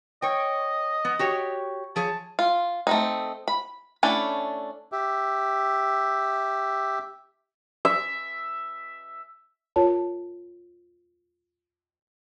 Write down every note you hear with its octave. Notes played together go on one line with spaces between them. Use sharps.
C#5 D#5 G5
B3
F#4 G4 C#5
F3 G#4 C#5 A5
F4
A3 C4 D#4
B5
A3 C#4 D4 E4
G4 E5
E5
F4 A#4 C#5 A5